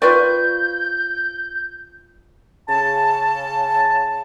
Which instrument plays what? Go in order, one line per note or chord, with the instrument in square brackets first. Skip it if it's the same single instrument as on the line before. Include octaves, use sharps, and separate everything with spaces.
[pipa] C4 C6 C#6 [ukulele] F4 B4 D5 [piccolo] G6
[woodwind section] C#3 A5